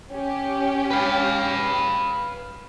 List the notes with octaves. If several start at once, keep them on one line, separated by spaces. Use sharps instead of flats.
C#4 G4
B4 F5